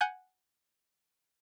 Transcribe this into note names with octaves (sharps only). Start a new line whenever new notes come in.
F#5 G#5 G6